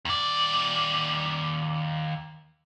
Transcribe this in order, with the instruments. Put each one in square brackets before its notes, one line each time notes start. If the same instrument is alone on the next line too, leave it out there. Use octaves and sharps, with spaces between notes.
[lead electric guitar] D#2 D5